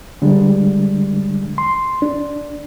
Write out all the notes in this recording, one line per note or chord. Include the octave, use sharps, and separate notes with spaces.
D3 G3 G#3 D4
C6
D4